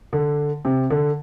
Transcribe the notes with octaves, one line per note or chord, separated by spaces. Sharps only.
D3
C3
D3